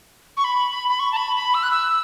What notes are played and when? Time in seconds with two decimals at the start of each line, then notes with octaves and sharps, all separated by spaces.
0.37 C#6
0.44 B5
0.71 B5
0.89 B5
0.99 C#6
1.12 A5
1.17 B5
1.36 B5
1.54 E6
1.63 F#6
1.71 E6